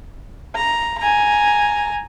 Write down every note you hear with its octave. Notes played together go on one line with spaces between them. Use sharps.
A#5
G#5 A#5